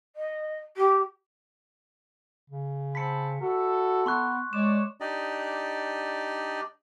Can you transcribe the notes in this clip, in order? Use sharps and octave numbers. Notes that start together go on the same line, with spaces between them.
D#5
G4
C#3
C4 A5 B5 B6 C#7
E4 F#4 A4
B3 C6 C#6 F#6
G#3 C#5 D5 E7
D4 D#4 G4 D5 D#5